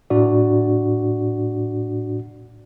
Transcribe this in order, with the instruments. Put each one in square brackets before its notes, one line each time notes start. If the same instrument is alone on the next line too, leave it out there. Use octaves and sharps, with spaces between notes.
[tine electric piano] A2 D4 F#4 D5